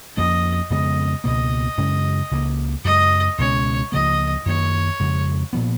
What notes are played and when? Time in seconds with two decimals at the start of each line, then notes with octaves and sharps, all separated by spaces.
0.17 F2 F3 A#3 C#4 D#5
0.70 F2 C#3 G#3 B3 D#5
1.24 C#2 B2 A#3 D#5
1.77 F#2 C#3 G#3 C#4
2.31 C#2 C#3 F3 A#3
2.84 F#2 C#3 G#3 D#5
3.38 C#2 B2 G#3 C#4 C#5
3.92 C#2 C#3 F3 A#3 D#5
4.46 F#2 D#3 A#3 C#5
5.00 F2 C#3 G#3
5.53 A#2 F3 B3